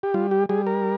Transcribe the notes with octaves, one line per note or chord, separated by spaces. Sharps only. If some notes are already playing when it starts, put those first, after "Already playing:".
G4
G3 F4
G4
G3 G#4
A#4